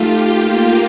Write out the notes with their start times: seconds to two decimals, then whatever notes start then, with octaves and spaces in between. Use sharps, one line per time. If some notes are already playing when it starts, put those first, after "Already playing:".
Already playing: A3 D#4 F4 G4
0.38 A#3